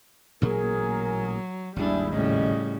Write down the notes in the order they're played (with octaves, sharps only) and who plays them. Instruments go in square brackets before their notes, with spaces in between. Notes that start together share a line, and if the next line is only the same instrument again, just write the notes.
[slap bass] A1 A#2 A#3 [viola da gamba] F#3 [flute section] G#4 A#4
[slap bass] G#1 D#2 [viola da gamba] G3 D4 [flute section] E4 G#4
[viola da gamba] A2 C#3 G3 [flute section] D#5